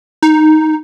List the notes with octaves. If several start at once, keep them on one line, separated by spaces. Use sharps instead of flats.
D#4